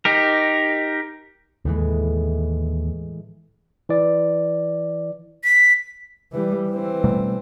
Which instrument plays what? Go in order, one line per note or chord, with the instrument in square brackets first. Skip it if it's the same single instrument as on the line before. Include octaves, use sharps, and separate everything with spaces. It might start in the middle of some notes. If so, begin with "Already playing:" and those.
[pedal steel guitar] D#4 G4 A#4
[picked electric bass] D#2 [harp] A2 E3 G#3
[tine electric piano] E3 D5
[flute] B6
[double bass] E3 G3
E3 C4
[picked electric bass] B2 G3 A3